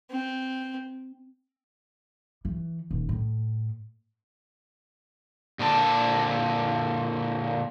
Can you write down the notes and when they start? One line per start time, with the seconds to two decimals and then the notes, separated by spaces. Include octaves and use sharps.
0.10 C4
2.45 E3
2.91 D#1
3.09 A2
5.59 A#2 D3 B4 A5